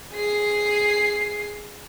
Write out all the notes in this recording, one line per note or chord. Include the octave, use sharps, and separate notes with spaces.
G#4 C7